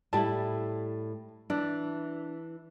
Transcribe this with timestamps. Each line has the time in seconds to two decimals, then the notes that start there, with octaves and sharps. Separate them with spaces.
0.13 A2 G3 E4 A5
1.50 E3 D4